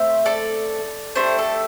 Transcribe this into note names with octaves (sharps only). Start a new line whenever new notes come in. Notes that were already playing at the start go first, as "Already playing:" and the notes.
Already playing: A3 C4 C5 E5
A4 D5
A3 D4 G4 C5
A4